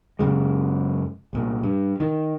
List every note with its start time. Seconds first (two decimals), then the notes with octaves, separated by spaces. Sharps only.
0.19 F#2 C#3 G#3
1.33 C2 A#2
1.63 G2
2.00 D#3